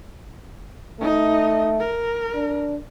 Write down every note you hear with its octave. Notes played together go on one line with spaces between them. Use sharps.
A3 D#4 D#5
A#4
D4